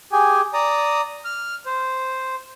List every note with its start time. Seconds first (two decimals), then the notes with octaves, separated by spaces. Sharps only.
0.12 G4 G#4 G#5
0.54 D5 A#5 D#6
1.25 F6
1.66 C5